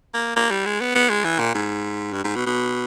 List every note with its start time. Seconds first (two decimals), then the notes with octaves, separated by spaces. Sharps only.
0.14 A#3
0.36 A#3
0.51 G3
0.66 G#3
0.81 B3
0.95 B3
1.10 G#3
1.25 E3
1.40 A#2
1.54 G#2
2.13 G2
2.24 G#2
2.35 B2
2.47 B2